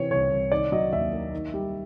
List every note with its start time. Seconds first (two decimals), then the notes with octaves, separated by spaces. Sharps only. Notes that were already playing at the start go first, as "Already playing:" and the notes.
Already playing: C3 E3 C4 C#5
0.10 C2 C#5
0.31 C2
0.51 D#3 D5
0.72 F#3 D#5
0.92 D#2 E5
1.13 A#3
1.33 D#3
1.54 G3